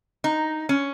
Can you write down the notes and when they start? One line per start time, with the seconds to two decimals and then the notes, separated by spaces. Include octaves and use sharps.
0.24 D#4
0.69 C#4